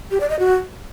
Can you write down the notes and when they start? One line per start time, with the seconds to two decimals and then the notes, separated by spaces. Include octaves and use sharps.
0.11 G4
0.20 D5
0.30 D#5
0.39 F#4